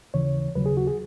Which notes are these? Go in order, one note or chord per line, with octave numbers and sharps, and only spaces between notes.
D#2 C#3 E3 C#5
D#2 C#3 F#3 B4
G#4
F#4
G#4